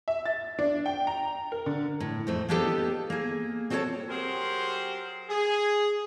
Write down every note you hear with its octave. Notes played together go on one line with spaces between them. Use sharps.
E5
A6
D4
G5
A#5
A#4
D3
A2
F2 A3 C4
A#3 B3 D4 D#4 G4 A4
A#3 G#4
C4 F#4 A4 A#4 C#5 A5
F#3 G4 G#4 A#4 C5
G#4